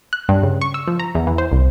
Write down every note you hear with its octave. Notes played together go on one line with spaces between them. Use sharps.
F#6
G2
C#3
C#6
E6
F3
A#5
E2
E3
C5
C2